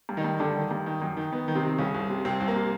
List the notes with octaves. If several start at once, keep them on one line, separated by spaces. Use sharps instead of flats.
G2
D#3 D#4
G2
G2 D3 D4
D#3
G2
D#3
F#2
D#3
D#3 B3
D#3
C3 C4
D#3
C2 C#3 C#4
C2
C3
C2 C3 C4
C2
A#3
C3